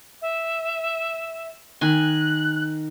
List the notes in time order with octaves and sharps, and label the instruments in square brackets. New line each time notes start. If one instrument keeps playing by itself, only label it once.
[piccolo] E5
[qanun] D#3 G#5 [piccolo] F#6